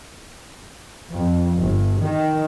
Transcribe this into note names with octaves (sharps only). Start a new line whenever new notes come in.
F2
G1
D#3